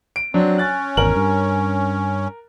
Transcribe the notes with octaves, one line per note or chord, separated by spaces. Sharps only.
D7
F#3 C4 D4
C#4 F#6 A6
G#1 E2 A#4 F#7
G2